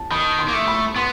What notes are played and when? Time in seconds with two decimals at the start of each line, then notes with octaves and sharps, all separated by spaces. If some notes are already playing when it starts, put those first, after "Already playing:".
Already playing: A5
0.11 D#3 B5
0.39 C6
0.48 A#3
0.54 A3
0.68 B5
0.96 B3 C6